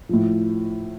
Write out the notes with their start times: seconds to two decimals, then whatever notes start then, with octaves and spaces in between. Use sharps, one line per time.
0.09 A2 F3